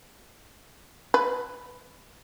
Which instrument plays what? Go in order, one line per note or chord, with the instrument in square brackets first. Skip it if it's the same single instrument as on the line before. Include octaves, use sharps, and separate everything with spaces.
[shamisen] B4